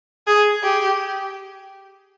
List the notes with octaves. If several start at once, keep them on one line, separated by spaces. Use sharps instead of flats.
G#4
G4